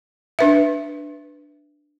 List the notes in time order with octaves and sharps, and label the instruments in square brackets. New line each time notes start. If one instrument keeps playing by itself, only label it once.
[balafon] D4 B4 E5